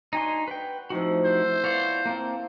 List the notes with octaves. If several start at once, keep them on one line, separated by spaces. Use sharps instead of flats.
D4 D#4 F#4 G#5 C6
B4 G5
A2 C3 F3 D#4 F#4
C5 E5
B3 F4 C#5 D5
A#3 C4 F4